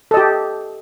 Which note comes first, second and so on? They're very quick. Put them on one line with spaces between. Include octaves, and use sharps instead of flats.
A4 D#5 G4